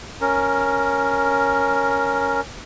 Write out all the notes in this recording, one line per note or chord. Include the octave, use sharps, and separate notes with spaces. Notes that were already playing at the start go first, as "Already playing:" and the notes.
C#4 A#4